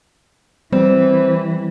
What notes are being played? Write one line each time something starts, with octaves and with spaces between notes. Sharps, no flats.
E3 G3 C4